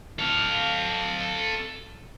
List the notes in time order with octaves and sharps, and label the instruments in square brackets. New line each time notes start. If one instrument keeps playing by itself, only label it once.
[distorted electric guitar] A4 F5